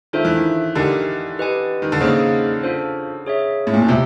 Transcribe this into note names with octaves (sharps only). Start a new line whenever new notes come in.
D#3 D4 F4 A4 C5 E5
E3
D#3
D3 D#4 G4 A#4 D#5 G#5
G4 B4 D#5 G#5
D#3
D3
C#3 A#3 D#4 G#4 C5 D#5
D4 F4 A4 C5
G#4 C#5 E5
A2
A#2
B2
C3 C4 F4